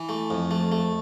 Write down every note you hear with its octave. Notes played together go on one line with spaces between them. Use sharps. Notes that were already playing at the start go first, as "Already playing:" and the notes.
Already playing: E3
A3
F2
A3
A3